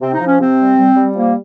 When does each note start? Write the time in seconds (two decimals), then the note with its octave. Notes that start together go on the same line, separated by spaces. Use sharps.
0.01 C3 C4
0.14 D#4
0.20 F3
0.27 C#4
0.39 C3 C4
0.59 G3
0.77 G3
0.96 G3
1.15 F3 A#3